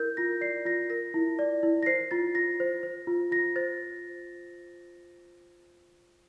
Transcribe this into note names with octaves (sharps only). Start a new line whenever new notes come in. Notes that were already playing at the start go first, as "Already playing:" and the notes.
Already playing: E4 A#4 G6
F4 A#6
D5 C7
F4 A#6
A#4 A#6
E4
D5
E4
A#6
C5 C7
F4 A6
F4 A#6
C5
C5
F4
F4 A#6
C5 A6